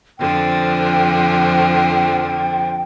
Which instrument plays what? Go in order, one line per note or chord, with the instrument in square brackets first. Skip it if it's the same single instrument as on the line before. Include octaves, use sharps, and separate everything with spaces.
[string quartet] F2 D3 F3 [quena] G5